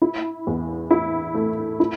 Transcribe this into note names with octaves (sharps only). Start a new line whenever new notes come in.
E4
E2
E4
A3
E4